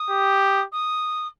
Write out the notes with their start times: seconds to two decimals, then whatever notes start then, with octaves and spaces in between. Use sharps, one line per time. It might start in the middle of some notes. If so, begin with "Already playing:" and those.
Already playing: D#6
0.10 G4
0.72 D#6